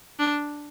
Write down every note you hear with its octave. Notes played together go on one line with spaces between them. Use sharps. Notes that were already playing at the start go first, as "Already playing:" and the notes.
D4